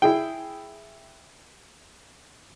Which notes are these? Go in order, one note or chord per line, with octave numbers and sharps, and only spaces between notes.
E4 G#4 G5